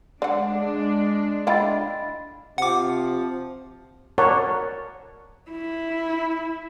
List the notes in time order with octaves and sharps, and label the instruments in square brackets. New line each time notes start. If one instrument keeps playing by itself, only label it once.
[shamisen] D3 F#5 [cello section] G#3 D4 [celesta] D5
[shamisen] E4 F4 G5 [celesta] D#5 B5 A6
[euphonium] C3 [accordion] F3 [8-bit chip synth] F#5 D6
[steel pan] A#4 C#5 D5 F#5 A5
[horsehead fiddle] E4